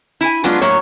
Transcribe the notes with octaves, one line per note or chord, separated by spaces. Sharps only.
E4 G#5
F#3 G#3 B3 D4 F4
A2 F#3 A#3 C#5